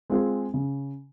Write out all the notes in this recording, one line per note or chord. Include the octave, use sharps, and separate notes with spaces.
G#3 C4 F4 G#4
C#3